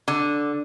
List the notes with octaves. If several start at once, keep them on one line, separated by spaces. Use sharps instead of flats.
D3